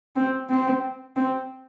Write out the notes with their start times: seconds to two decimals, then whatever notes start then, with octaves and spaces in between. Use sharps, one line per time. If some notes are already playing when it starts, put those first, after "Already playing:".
0.16 C4
0.50 C4
1.16 C4